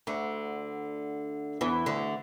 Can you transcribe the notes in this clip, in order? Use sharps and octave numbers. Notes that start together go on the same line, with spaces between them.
D2 D3
E2 E3
D2 D3